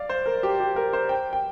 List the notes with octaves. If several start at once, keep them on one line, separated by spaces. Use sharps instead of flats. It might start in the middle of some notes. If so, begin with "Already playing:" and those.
Already playing: D5 F5
C5
A#4
G4
G4
A#4
C5
G5
G5